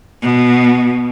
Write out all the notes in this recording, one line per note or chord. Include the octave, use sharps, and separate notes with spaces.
B2